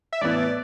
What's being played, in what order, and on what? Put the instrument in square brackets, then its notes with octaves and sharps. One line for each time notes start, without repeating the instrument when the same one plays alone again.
[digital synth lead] E5
[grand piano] A2 E3 B3 E4 [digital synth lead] D5